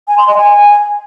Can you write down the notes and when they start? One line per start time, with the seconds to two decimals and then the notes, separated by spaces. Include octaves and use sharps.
0.08 G#5
0.18 C6
0.28 D#5
0.37 G#5